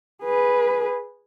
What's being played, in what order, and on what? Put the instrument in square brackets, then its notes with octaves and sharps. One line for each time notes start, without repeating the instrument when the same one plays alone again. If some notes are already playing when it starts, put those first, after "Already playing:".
[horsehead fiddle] G#4 B4